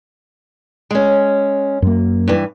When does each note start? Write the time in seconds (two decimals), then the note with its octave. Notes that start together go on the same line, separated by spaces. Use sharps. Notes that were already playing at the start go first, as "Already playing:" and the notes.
0.91 G#3 C#4
1.82 F#2 A#3
2.28 G2 E3